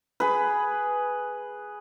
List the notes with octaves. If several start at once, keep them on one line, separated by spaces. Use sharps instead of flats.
G#4 B4